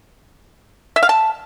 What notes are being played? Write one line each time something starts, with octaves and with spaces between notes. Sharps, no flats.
E5
F5
A5